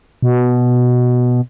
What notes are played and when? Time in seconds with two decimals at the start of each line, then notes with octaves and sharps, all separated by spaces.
0.23 B2